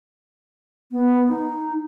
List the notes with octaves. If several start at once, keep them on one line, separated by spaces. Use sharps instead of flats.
B3
D#4